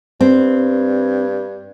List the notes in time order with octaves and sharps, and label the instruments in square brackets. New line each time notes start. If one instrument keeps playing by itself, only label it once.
[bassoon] G2 [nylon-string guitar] C4